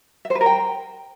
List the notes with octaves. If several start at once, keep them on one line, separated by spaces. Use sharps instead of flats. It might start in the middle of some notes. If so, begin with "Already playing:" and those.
E5
C5
B4
A#4
G5